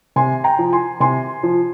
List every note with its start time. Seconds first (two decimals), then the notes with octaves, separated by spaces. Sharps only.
0.16 C3 G#5 C6
0.44 G5 A#5
0.59 F3
0.73 G#5 C6
1.00 C3 G#5 C6
1.43 F3